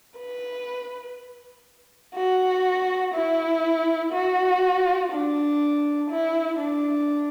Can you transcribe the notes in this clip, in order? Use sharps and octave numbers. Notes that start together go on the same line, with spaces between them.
B4
F#4
E4
F#4
D4
E4
D4